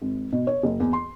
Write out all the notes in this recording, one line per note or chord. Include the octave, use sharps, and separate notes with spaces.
G#1
B2
C#5
F#1
E2
C6